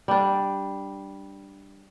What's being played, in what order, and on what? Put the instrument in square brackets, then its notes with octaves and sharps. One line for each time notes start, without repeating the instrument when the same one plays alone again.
[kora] G3 D4